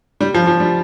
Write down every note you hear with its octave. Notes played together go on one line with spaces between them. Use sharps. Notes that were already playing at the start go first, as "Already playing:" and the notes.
G3
F3
F3
G3